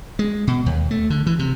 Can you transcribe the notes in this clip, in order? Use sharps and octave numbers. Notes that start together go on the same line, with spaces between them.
G#3
B2
D#2
A3
D3
E3
C3